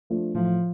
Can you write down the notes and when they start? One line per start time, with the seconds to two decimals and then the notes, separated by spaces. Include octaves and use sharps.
0.10 F3 A3 D4
0.35 A2 F3